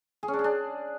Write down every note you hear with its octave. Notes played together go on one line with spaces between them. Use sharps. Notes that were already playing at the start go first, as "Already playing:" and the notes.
G#4
C#4
D4
G#4
D4